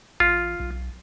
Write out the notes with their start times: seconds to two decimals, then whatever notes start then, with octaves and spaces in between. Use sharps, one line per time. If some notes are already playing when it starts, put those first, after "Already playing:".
0.20 A1 F4
0.60 B1